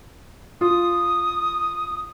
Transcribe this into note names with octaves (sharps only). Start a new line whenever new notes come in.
F4 D#6